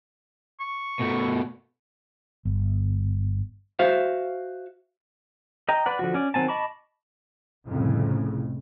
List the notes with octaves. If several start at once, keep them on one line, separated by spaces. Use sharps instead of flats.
C#6
B2 A3
G1
F#4 C5 E5 F5
D#5 G5 A#5
B4 D5 F#5
D3 F3 F#4
C#4 D5
D#3 F#3 C4 G#5 A5
D#5 A5 B5 C#6 D6
C2 F2 A2 C#3